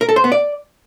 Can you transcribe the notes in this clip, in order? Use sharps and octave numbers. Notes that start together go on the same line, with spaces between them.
A#4
A4
C5
B3
D5